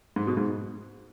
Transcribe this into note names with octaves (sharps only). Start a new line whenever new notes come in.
G#2
B2
G#2